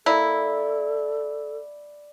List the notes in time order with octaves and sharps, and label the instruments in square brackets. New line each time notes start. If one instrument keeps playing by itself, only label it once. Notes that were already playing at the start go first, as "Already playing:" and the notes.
[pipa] A#3 E4 [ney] A4 [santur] D5